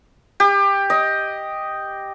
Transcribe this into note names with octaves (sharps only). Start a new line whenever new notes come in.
G4
D#5